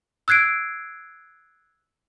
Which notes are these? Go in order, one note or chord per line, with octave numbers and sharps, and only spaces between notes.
E6 F#6 G#6 C7 D7